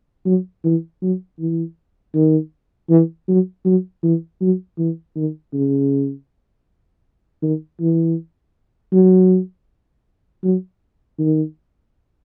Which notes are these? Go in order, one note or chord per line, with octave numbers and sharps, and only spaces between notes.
F#3
E3
F#3
E3
D#3
E3
F#3
F#3
E3
F#3
E3
D#3
C#3
D#3
E3
F#3
F#3
D#3